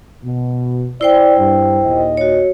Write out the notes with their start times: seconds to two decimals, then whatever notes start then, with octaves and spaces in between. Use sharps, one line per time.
0.23 B2
1.01 E4 C5 D5 G5
1.38 G2
1.84 D#2 A#2 D#5
2.17 F#4 C#5